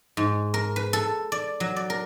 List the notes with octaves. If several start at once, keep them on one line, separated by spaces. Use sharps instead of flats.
G#2
A#4
B4
A4
D5
F#3
D5
A#4